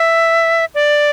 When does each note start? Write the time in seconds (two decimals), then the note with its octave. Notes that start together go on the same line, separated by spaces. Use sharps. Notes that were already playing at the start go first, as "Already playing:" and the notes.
Already playing: E5
0.75 D5